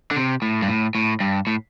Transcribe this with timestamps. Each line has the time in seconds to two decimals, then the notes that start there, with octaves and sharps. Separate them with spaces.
0.11 D3
0.16 C3
0.42 A2
0.62 G2
0.68 A2
0.95 A2
1.20 G2
1.47 A2